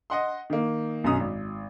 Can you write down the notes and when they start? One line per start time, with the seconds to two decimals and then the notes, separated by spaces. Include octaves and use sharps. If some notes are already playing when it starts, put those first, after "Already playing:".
0.10 D#5 F#5 C6
0.50 D#3 A#3
1.04 B1 F#2 B2 C#4 D#6
1.19 G#1